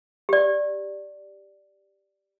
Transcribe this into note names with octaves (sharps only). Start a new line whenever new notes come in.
G4 D5